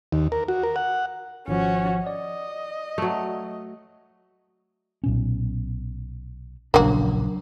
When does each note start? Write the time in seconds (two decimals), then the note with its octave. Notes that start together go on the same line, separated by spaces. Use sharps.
0.13 D#2
0.32 A#4
0.48 F#4
0.63 A#4
0.76 F#5
1.48 G#1 F3 C#4 F#4
2.07 D5 D#5
2.98 F#3 A3
5.04 B1 A#2 C#4
6.74 D1 A#1 C#3 F#3 A#3 D4 F#4